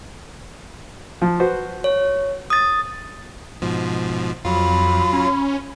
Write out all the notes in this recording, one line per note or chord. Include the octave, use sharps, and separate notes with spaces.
F3
F#4 B4 C5
C#5
D#6 A6
G#2 B2 F3
F2 F#3 F4 B5
C#4